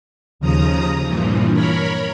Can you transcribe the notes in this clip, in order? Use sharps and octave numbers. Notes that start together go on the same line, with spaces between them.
D#2 C#3 F3 A#5 D#6
G2 A#2 E3 F3
A#4 C#5 B5